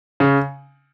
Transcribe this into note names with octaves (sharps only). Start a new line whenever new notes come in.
C#3